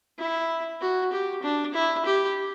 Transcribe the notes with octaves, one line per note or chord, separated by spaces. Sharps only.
E4
F#4
G4
D4
E4
G4